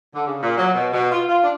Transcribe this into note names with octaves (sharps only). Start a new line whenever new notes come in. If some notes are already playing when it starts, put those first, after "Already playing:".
D3
C#3
A#2
F#3
B2
B2
F4
F4
D4